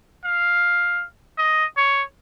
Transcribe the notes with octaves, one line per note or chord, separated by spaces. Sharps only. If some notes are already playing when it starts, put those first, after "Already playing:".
F5
D#5
C#5